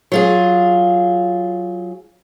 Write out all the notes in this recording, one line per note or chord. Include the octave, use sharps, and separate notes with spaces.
F#3 F4 G#4